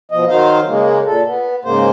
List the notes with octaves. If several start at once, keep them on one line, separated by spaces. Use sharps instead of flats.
B2 F3 D#5
D#3 F#3 D#4 C5 F5
C#3 G#3 A#3
A#2 A4
B3
G#2 C#3 A#3 C5